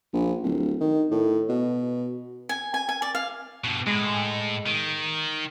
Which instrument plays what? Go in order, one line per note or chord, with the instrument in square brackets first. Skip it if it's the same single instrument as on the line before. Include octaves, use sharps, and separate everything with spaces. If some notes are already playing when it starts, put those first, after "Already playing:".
[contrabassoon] A#1
D1
D#3
A2
B2
[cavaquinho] G#5
G#5
G#5
D5
F5
[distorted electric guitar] G2 B2
[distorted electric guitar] A2 [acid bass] G#3
[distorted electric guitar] D#3